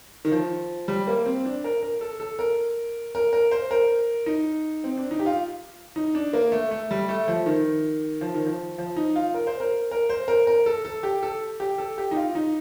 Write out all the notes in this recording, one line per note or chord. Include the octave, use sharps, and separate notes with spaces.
D#3
F3
G3
A#3
C4
D4
A#4
A#4
A4
A4
A#4
A#4
A#4
C5
A#4
D#4
C4
D4
D#4
G4
F4
D#4
D4
A#3
A3
A3
G3
A3
F3
D#3
F3
D#3
F3
F3
D#4
F4
A#4
C5
A#4
A#4
C5
A#4
A#4
A4
A4
G4
A4
G4
A4
G4
D#4
F4
D#4